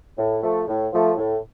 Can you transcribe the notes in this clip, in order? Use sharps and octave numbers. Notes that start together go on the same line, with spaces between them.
A2
F3 A3
A2
F3 A3
A2